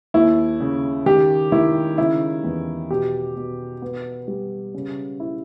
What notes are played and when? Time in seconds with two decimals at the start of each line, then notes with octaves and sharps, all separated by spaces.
0.14 D#2 E4
0.60 C#3
1.06 D#3 G4
1.52 D#3 E4
1.98 C#3 E4
2.44 E2
2.90 B2 G4
3.36 B2
3.82 B3
4.28 G3
4.74 C#3
5.20 E4